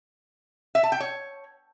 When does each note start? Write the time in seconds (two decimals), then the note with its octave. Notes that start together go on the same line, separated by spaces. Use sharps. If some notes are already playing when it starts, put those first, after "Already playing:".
0.75 E5
0.83 A5
0.92 G5
1.00 C#5